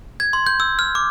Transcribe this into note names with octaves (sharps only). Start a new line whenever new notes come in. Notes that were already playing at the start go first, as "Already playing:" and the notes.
G#6
C6
G6
E6
F6
D6